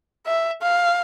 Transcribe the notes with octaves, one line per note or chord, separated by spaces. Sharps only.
E5
F5